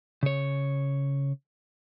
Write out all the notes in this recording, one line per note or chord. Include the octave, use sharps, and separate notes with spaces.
C#3 C#5